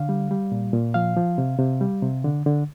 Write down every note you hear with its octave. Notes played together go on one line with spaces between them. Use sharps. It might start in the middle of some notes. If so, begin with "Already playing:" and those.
Already playing: D3 F5
G3
G3
A#2
A#2
F3 F5
F3
C3
C3
G3
C3
D3
D3